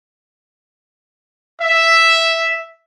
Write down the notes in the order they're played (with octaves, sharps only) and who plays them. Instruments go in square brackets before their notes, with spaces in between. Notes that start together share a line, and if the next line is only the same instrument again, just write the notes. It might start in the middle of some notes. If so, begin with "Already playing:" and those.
[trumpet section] E5